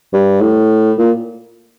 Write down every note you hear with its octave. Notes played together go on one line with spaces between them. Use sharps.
G2
A2
A#2